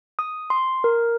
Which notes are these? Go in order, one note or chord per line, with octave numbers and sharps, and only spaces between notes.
D#6
C6
A#4